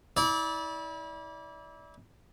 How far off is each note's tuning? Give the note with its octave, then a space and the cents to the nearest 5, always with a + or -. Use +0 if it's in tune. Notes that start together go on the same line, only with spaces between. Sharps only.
E4 -35 D5 -20